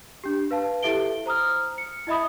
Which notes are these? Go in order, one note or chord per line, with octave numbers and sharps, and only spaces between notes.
D4 G4
B4 F5 A5
E4 G4 A4 E5 D7 G7
C5 A#5 D#6 F6
C#7
E4 D#5 E5 B5 D#6